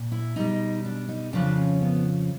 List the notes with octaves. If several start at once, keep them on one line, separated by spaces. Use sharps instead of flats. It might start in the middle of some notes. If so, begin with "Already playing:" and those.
Already playing: A#2
E4
B2 G3 D#4
D4
D#4
F2 C#3 F3 D4
C#4
B3